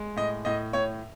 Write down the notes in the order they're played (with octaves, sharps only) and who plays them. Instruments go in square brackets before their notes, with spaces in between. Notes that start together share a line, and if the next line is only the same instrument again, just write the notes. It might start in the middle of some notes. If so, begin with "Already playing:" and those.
Already playing: [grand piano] G#3
A2 D#5
A2 D#5
A2 C#5